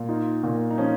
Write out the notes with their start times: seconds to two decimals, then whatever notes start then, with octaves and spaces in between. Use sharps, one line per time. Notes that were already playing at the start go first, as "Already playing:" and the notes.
Already playing: A#2
0.09 D#4 F4
0.43 A#2
0.70 D#4
0.78 F3 C#4